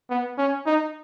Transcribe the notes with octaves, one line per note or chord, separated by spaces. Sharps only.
B3
C#4
D#4